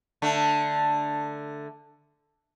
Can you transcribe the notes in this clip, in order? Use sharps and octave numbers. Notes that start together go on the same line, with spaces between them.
D3 A3